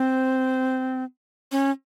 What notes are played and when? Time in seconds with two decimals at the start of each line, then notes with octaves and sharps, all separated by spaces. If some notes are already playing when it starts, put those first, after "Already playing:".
Already playing: C4
1.52 C#4